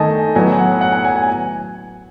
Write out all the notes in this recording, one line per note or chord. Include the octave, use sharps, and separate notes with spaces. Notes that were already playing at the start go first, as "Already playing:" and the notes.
Already playing: D#3 A3 D#5 G#5 A5
A2 F#3 B3 G#5
F#5
F#5
G#5
G#5
G#5